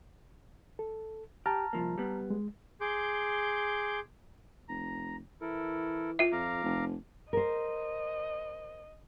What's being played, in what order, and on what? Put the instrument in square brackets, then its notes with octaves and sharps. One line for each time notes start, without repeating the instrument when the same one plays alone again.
[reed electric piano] A4
[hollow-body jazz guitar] G4 [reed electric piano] A5 A#5 F6
[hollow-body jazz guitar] C2 F3 A#3
G3 B3
[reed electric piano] G#3
[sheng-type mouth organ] G#4 C6 D6 G6
[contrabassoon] F1 [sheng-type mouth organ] A#5
[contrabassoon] E3 [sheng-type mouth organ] E4 A4 A#4
[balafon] F4 E5
[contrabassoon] F2 [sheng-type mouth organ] F5 A#5 D6
[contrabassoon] F1
[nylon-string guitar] A#4 C5 [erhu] D#5